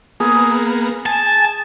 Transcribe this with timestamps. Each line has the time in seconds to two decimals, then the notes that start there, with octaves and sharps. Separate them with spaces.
0.20 A#3 B3 G#4
1.06 G#5 A5